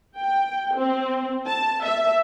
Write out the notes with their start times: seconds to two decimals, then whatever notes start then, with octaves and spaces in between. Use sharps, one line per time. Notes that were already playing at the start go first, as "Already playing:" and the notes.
0.17 G5
0.77 C4
1.46 A5
1.83 E5